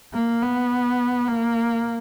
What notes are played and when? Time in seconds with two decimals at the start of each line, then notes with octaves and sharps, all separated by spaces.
0.14 A#3
0.42 B3
1.28 A#3